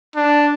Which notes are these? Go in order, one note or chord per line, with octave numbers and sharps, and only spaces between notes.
D4